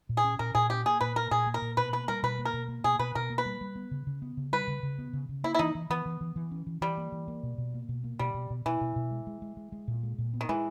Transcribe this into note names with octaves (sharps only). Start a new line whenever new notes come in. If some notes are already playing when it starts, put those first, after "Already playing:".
A#2
G#4
C#4
A#2 A#4
A#2 G#4
C#4 G4
A#3 G#4
A#2 B4
A#3 A#4
A#2 G#4
A#3
A#4
A#2
B2 B4
A#3 B4
G3 A#4
B2 B4
A#3
A#4
B2
A#3
B2 G#4
B2 B4
B2 A#4
A#3
B4
G3
G3
B3
C#3
C#3
B3
C#3
G3 B4
C#3
C#3
B3
C#3
C#3
A#3 E4
E4
E3 D#4
E3
E3 B3
E3
E3
E3
C#4
E3
E3 G3
A#3
E3
A#3
B2
B2
A#3
B2
A#3
B2 G3
B2
B2
B2 E3
B2
B2
G#3
G#3
G#3
G#3
G#3
A#2
G#3
A#2
B3
D#3
E3 G#3